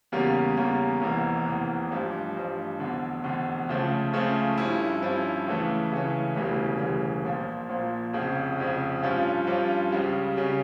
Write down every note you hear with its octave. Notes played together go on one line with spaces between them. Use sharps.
E2 C#3 G3 A#3 C#4
E2 C#3 G3 A#3 C#4
F1 E2 E3 A#3
F1 E2 E3 A#3
A1 G2 F3
A1 G2 F3
F1 E2 D3
F1 E2 D3
C#2 C#3 F3 A3 C#4
C#2 C#3 F3 A3 C#4
G2 F3 C#4 E4
G2 F3 C#4 E4
C#2 C#3 E3 A3 C#4
C#2 C#3 E3 A3 C#4
E1 D2 C#3 E3 G3
E1 D2 C#3 E3 G3
A#1 A#2 F3
A#1 A#2 F3
F1 F2 C#3
F1 F2 C#3
G2 F3 C#4 F4
G2 F3 C#4 F4
C#2 C#3 G3 C#4
C#3 G3 C#4